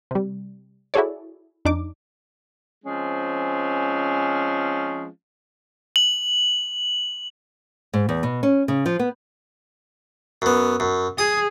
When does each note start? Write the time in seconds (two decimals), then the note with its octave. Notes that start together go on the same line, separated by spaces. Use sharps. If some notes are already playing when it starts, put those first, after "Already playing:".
0.11 C3 G3
0.94 E4 F#4 G#4 A4 C#5 D5
1.65 F2 D4 D#4 D6
2.85 F3 G#3 C4 C#4
5.96 F#7
7.93 G#2
8.09 E2
8.23 B2
8.43 C#4
8.68 C#3
8.86 F3
8.99 B3
10.42 F#2 B3
10.80 F#2
11.18 G#4 D#6